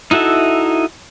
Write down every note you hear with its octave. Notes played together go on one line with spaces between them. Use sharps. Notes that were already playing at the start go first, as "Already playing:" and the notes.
D#4 E4 F#4 A4 E5